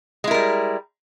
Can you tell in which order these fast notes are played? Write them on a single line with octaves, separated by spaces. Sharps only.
G#3 E4 A#4 G3